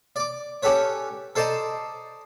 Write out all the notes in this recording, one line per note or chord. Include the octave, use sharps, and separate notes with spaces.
D5 D6
C#4 G4 A4 B4 C#5
A4 C5 D5 D#5 A5 A#5